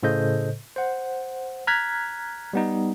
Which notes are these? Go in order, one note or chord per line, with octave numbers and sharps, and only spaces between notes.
A2 C#3 A4 C5 D#5 G6
C5 F#5
A#5 F6 F#6 G#6 B6
G3 B3 D#4